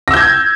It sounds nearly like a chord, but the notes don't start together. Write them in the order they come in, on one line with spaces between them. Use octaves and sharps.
A#6 E6 G6 G#6